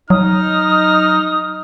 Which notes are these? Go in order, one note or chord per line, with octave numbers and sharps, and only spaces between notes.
F#3 D#4 D#6 F6